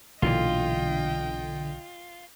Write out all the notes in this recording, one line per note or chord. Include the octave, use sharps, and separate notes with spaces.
B1 A#2 D3 E3 F4 D#5 G5